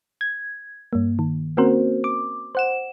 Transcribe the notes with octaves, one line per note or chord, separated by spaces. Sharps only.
G#6
G2 A#3
D#3
A#3 C4 C#4 F#4 A#4 C5
D6
C5 F#5 E7